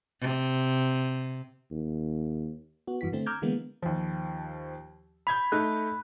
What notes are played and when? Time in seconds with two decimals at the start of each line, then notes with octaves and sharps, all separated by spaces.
0.21 C3
1.71 D#2
2.87 B3 F#4
3.01 G2 E3 F#4 B6
3.12 D3 A3 C4
3.26 A#5 D6 E6 F6 G6 G#6
3.42 D3 E3 G#3 A#3 B3
3.82 D#2 F3
5.27 B5 G6 G#6 B6
5.52 A3 D#4 F#6